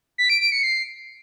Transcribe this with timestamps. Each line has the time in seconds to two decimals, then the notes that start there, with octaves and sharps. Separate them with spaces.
0.18 B6
0.30 D7
0.41 D7
0.52 C#7
0.63 C7